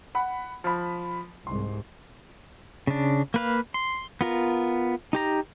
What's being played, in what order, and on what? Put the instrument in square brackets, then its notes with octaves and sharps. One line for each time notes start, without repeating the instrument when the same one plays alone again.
[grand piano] F#5 B5
F3 B5
[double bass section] C2 G#2 [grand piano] C6
[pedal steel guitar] C#3 D4
A#3 B4 F5
C6
B3 F4 A#4
D#4 G4 A#5